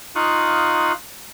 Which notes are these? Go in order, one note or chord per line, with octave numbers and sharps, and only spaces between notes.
D#4 F4 F5 C#6 D#6 F#6